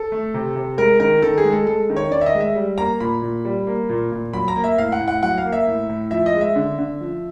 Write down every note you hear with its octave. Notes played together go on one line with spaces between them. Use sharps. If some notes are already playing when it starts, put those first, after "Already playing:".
Already playing: A4
A3
C3
C3
G#3 A#4
D#3 A#4
D#3 A4
G#4
G#3
A4
G#3 A4
D#3
C#5
D#3 D5
E5
D#5
G#3
E5
G3
A#3 A#5
A#2 B5
A#2
G3
A#3
A#2
A#2
F#3 B5
A#5
A#3
E5
A2 F5
F#5
A2
F#5
F#3 F#5
F5
A#3
E5
A2
A2
F3 E5
D#5
G#3
E5
D3
D3
F3